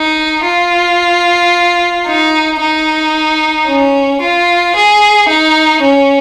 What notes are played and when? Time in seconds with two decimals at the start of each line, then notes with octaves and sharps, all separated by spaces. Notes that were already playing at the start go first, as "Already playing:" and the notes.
Already playing: D#4
0.46 F4
2.07 D#4
2.61 D#4
3.68 C#4
4.22 F4
4.76 G#4
5.29 D#4
5.82 C#4